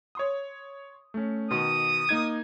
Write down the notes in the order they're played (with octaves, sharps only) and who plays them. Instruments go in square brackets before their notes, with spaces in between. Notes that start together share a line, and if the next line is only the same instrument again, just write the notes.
[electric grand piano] C#5 C6 D#6
A3 C#4
[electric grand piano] B2 D#3 C6 [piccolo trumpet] D#6
[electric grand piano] A#3 D#4 G#6